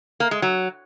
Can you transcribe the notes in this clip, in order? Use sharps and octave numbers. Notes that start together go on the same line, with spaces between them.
A#3
G#3
F#3